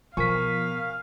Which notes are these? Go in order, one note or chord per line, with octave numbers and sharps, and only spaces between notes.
B2 F3 A#4 F5 G#5 C#6 B6